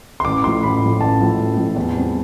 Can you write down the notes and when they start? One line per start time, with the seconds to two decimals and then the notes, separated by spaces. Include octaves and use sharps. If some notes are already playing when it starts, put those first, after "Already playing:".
0.20 C6
0.25 A1 D6
0.43 A2 F3 C6
0.63 A1 B5
0.82 A2 F3
1.01 A1 A5
1.19 A2 F3
1.39 A1
1.57 A2 F3
1.76 E2
1.95 C3 G3 C4